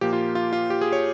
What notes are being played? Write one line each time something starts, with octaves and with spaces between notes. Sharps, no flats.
A#2 F3 A#3 G4
F4
F4
F4
G4
G#4
C#5